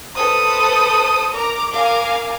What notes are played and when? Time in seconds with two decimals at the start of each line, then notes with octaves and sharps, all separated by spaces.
0.16 A4 B4 C5 D#6
1.35 A#4 A#5 D6
1.74 A#4 F5 G#5